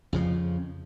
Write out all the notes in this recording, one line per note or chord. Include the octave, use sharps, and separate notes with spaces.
F2 C#3 F3